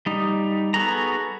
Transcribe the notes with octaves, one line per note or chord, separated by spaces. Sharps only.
G3 D#4
B3 F#4 G#4 A4 A#5